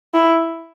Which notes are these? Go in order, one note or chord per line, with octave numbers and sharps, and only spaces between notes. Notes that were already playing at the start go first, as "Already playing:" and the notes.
E4